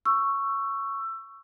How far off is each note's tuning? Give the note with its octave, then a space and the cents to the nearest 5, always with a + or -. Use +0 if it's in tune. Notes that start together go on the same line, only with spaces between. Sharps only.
C#6 +0 E6 +20